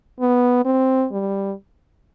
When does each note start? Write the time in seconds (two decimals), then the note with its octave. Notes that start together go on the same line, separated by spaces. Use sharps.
0.20 B3
0.65 C4
1.12 G3